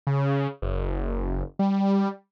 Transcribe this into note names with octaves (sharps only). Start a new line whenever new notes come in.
C#3
F#1
G3